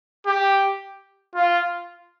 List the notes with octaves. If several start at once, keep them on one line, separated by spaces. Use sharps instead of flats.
G4
F4